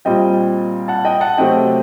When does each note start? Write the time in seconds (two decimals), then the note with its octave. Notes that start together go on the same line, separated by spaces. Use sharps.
0.05 A#2 G3 C4 D#5 G5
0.88 F#5 A5
1.05 D#5 G5
1.21 F#5 A5
1.38 C3 F#3 A3 C4 D#5 G5